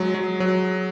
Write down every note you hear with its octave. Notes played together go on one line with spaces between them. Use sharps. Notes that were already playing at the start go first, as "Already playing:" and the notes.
Already playing: F#3 G#3
F#3
F#3